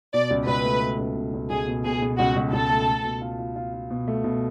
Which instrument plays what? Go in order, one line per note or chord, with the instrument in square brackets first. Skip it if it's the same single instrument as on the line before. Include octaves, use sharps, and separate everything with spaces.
[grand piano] B2 [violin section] D5
[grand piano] C#2
[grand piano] C#2 [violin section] B4
[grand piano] A3
A3
C#2
B2
C#2
[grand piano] C#2 [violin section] G#4
[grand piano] B2
[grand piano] B2 [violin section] G#4
[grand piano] B2
[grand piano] C#2 [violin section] F#4
[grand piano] C#2
[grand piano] C#2 [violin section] A4
[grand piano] A3
A3
B2
F4
F4
F4
F4
B2
A3
B2